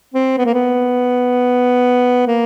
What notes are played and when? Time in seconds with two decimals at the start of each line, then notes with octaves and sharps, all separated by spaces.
0.14 C4
0.37 B3
0.46 A#3
0.54 B3
2.27 A#3